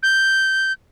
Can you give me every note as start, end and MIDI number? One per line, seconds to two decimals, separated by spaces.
0.03 0.72 91